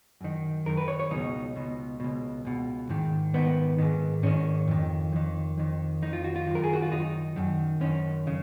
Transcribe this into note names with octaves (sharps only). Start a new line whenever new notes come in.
F#2 D#3
F#2 D#3 A#4
B4
C#5
C#5
C#2 B2 D#4
C#2 B2
C#2 B2
C#2 B2
G#2 D#3
G#2 D#3 B3
G#2 D#3
G#2 D#3 C#4
F2 D#3
F2 D#3
F2 D#3
F2 D#3 D#4
F4
F#4
F4
F#2 D#3
A#4
G#4
F#4
F4
F#2 D#3 D#4
F#2 D#3
F#2 D#3 C#4
C#3